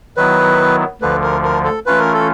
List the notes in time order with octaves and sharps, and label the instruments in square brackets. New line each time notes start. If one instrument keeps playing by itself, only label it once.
[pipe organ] D#3 F#3 B3 E4 [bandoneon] B4
[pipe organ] D2 D3 F3 [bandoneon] B4
[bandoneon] A#4
A#4
A4
[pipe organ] E3 A3 C#4 F4 [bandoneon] B4
[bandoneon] A#4
A4